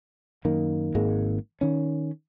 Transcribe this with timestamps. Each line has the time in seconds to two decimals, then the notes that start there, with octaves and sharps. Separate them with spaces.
0.45 F#2 D#3 A#3
0.95 G#1 G#2 G#3 A#3
1.61 D#3 C#4